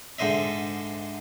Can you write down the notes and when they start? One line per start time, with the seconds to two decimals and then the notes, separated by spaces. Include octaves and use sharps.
0.19 G#2 D3 C5 D#5 E5